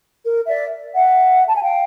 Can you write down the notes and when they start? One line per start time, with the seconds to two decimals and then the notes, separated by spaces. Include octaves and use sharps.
0.24 A#4
0.48 D5 E5
0.94 E5 F#5
1.48 A5
1.55 G#5
1.62 F5 G5